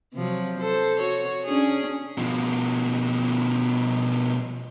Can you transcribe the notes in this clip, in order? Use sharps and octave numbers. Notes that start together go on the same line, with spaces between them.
C3 F3 F#3
A4 C5
F#4 C#5
C#4 D4 G#4
B2 F3